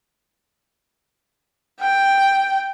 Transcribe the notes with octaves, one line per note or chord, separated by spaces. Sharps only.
G5